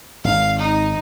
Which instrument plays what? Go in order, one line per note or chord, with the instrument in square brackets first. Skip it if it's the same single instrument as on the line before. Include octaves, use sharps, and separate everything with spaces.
[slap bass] G#1 [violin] F5
[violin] D#4